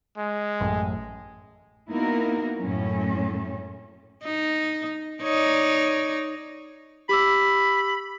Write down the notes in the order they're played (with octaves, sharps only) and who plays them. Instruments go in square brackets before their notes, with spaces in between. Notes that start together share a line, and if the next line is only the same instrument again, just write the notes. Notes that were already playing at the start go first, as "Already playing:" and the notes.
[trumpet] G#3
[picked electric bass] A1 F#2 A2
[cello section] A#3 B3 D#4 E4 F#4 A#4
F#2 A2 F#3 C#4
[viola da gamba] D#4
D#4 C#5 D5
[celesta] G4 D6 E6 [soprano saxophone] B5